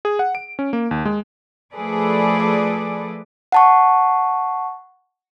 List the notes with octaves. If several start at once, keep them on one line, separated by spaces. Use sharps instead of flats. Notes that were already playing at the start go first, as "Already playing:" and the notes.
G#4
F#5
D7
C#4
A#3
D#2
G#3
F3 A3 G#4 A4 B4 D5
F#5 A5 C#6